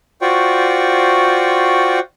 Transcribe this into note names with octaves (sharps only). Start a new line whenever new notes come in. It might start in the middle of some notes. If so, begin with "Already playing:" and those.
F4 F#4 C5 D5 G5 C#6